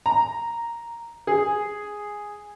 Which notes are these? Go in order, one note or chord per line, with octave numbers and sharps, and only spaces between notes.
A#5
G#4